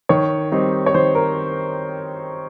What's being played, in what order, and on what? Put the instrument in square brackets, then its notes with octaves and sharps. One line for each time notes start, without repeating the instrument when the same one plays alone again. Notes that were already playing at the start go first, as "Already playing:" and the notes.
[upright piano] D#3 C#5
G3 C4 D#4
C#5
D#3 C5
A#4